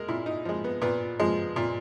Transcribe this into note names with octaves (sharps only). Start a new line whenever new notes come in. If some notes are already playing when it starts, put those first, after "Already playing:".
Already playing: G#3 A#4
A#2 E4
D#4
F3 G#3
B3
A#2 B3
F3 G#3
A#2